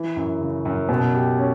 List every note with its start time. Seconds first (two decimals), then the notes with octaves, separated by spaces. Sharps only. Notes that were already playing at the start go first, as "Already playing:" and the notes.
Already playing: E3
0.16 F#2
0.40 C#3
0.65 F#2
0.89 B2
1.14 G4
1.39 C#4